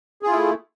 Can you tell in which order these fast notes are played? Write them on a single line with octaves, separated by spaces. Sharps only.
G#4 F4 E4 A3